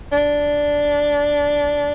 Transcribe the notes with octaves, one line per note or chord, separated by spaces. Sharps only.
D4